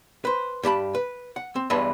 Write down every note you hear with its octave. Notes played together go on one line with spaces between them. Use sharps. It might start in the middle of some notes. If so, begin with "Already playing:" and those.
B4 C5
G2 G4 A5 B5
B4
F#5
C4
E2 G2 E3 G#3 B4 A5